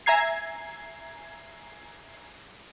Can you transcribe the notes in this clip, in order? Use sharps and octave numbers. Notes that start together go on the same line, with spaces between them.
E5 G#5 A#5 G#6 C7